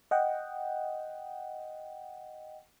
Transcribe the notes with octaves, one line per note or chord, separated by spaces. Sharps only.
D#5 F#5 G5